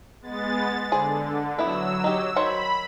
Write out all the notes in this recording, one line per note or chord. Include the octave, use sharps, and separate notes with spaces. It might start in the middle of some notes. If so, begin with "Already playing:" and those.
G#3 B3 A6
D3 G#4 C5 D5
F#3 B3 E4 B4 E6
D#4 G4
D#3 C5 C#5 B5